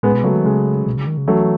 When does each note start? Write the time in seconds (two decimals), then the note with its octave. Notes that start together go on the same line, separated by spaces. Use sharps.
0.03 A2 G#3 B3
0.14 B2
0.24 C#3 F#3 A3
0.35 D#3
0.44 C#3 G#3
0.87 B2
0.97 C#3
1.07 D#3
1.18 C#3
1.28 E3 F#3 A3